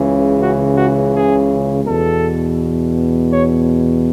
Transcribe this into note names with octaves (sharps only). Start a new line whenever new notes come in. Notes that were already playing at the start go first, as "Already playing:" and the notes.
Already playing: C#2 C#3 E3
F#4
F#4
G#4
E2 B2 A4
C#5